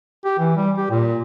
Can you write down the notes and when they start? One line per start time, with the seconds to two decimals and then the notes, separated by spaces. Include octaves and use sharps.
0.25 G4
0.39 E3
0.57 G3
0.78 G4
0.90 A#2